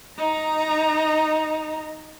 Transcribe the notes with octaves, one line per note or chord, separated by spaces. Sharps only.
D#4 A#5